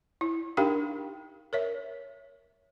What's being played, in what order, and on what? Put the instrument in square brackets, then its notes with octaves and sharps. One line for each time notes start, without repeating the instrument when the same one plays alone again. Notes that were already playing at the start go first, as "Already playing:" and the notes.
[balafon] E4
D4 D#4 G4 A#4 F5 G5
A#4 C#5 E5